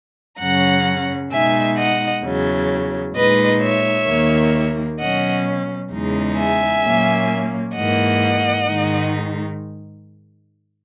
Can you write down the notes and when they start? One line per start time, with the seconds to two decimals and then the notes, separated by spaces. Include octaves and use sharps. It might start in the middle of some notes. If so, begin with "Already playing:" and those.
0.40 F#2 C#3 F#3 C#4 F#5 A#5
1.31 B2 G#3 D#4 E5 G#5
1.78 D#5 F#5
2.23 E2 C#3 F#3
3.15 A#2 G#3 D#4 B4 D#5
3.62 C#5 E5
4.08 D#2 D#3 A#3
4.99 B2 F#3 C#4 D#5 F#5
5.91 E2 C#3 G#3 D#4
6.38 E5 G#5
6.83 A#2 F#3 A#3 C#4
7.75 G#2 E3 A#3 D#5 F#5
8.67 G#2 D#3 G#3 D#4